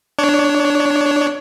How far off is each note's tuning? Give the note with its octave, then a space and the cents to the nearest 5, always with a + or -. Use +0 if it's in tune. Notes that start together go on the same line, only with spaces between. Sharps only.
D4 +0 C#5 +20